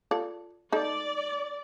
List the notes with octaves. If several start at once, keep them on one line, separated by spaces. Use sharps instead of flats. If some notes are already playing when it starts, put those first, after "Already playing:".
F4 A4 D5
D#4 A4 D5